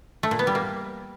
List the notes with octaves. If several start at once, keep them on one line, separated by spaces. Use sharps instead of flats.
A3
A#2
B3
G3
A#3